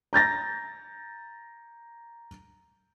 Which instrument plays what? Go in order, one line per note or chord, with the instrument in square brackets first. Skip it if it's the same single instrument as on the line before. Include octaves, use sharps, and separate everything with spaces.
[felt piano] A#5 G6 A6 A#6